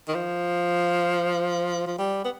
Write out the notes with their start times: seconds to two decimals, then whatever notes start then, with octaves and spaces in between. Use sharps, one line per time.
0.08 D#3
0.14 F3
1.87 F3
1.98 G3
2.25 B3